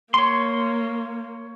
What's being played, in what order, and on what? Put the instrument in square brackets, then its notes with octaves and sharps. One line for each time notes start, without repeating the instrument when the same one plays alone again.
[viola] A#3 [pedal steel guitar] C#5 C6